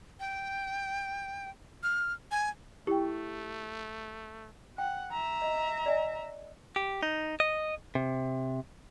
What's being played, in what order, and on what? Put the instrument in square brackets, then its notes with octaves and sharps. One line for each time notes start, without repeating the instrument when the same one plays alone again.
[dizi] G5
F6
G#5
[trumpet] A3 [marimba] E4 G5 [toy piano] G4
[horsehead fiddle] F#5 [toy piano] G5
[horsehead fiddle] E5 A#5
[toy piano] D#5
D5 D#5 G#5
[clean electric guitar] G4
D#4
D#5
C3